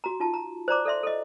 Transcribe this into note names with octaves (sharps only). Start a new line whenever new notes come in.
F#4 A#5
D#4 F4 A5
A#5
C5 D5 A#5 D6
A4 D5 E5 C6
A4 D#5